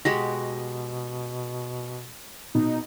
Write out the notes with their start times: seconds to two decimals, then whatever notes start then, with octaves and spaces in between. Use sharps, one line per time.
0.05 B2 G#3 F#4 G4 A#6
2.55 B2 D#4